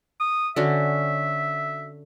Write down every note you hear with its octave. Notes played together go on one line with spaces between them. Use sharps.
D#6
D3 C#4 F#4 E5